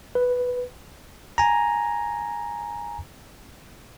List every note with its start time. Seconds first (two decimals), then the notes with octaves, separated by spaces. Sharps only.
0.15 B4
1.38 G#5 A#5